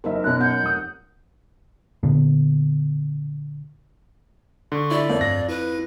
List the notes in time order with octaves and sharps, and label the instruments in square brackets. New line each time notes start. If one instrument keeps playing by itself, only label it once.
[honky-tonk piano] F#1 E5 [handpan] F#3 D#4 A#4
[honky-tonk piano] F#2 B2 [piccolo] F#6
[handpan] F#5 [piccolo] G6
[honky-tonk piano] F1 D#6
[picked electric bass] A#2 D3 B3
[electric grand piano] D3 [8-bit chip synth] C6 C#6
[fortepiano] E4 [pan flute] D5
[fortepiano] F2 [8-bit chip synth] A#4 C#5 E5
[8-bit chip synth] G2 [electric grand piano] A#6
[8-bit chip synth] E4 [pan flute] B4